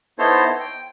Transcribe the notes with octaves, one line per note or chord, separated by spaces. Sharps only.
B3 D#4 E4 A4 C5 C#5
G5